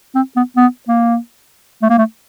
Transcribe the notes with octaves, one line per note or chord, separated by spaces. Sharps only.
C4
B3
B3
A#3
A3
A#3
A3